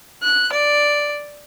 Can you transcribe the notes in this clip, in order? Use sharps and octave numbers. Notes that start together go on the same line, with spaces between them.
F#6
D5